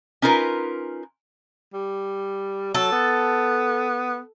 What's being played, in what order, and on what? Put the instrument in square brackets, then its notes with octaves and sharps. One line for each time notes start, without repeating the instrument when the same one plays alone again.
[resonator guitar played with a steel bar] C#4 D#4 F4 A#4 B4
[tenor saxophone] G3
[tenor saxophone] F#3 [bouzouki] A4
[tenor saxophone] B3